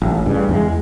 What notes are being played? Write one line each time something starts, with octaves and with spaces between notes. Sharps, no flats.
A1
G2 C#3
E2 G3 G#3